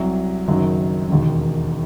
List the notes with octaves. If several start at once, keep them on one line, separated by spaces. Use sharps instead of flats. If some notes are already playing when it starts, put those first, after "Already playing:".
Already playing: C2 C3 F#3
F#1 F#2 D#3 F#3
E1 D#2 D#3